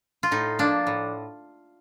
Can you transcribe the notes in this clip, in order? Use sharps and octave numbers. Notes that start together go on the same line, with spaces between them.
F4
A2 D#4
F3 A#3 D4
A2